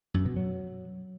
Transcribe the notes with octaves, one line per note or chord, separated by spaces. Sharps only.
F#2
B2
F#3